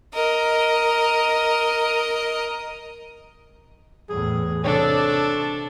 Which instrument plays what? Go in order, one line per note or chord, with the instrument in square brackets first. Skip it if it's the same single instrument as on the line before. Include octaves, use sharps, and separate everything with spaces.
[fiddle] A#4 D#5
[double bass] E2 A2 [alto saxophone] G#4
[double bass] C3 [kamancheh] D4 A4 [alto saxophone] C#5